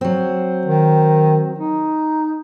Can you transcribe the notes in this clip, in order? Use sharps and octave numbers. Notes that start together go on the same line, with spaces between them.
F#3 C4
D#3
D#4